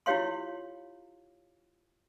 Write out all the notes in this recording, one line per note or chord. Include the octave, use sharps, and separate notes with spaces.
E4 F4 G4 C#5 F5 C6